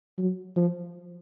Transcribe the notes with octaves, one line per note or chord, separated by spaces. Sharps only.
F#3
F3